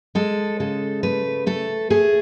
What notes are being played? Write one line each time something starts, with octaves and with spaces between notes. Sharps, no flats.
G#3 A4
C#3 A4
A3 B4
A3 A4
A3 G#4